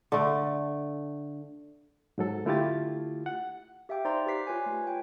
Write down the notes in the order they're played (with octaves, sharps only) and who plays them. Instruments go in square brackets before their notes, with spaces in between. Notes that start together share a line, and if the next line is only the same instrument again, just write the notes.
[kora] D3 A3
[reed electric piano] G#2 F#3 A4
D3 A3 E4 F4 G4 A6
F#5
[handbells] G4 E5 F5 G5 D6
D#4 C5 D5 A#5 C6
G4 B4 D6 B6 C7
F4 B4 C#5 G#5
A3
C#5 G5